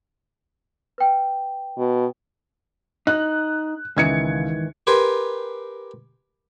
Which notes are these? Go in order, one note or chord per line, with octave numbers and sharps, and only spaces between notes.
B4 G5
B2
D#4 F#6
C#2 G#2 D#3 E3 G#6 C#7
G4 A#4 B4 G#5 C6